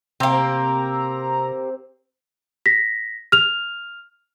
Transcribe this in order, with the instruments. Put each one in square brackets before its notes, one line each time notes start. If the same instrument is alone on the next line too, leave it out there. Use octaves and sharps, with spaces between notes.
[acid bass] C3 [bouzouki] A#3 G4 [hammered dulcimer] C4 [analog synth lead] A#5
[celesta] A#6 B6
F6 F7